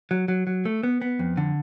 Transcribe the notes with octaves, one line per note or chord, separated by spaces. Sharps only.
F#3
F#3
F#3
A3
B3
B3
F2
D3